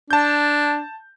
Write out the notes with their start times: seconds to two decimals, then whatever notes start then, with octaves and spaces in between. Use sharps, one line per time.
0.11 D4 A5 G6